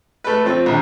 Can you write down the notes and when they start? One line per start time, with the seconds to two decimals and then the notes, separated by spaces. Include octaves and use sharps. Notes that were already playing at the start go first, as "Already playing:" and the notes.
0.24 A3 B4
0.45 F3 C4
0.66 A#1 D#2